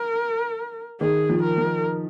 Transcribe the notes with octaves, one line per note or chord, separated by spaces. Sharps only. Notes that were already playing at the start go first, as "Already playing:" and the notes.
Already playing: A#4
D#3 G#4
F3
A#4
F3